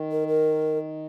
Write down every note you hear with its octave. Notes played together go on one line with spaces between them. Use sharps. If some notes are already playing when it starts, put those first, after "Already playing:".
Already playing: D#3
A#4
A#4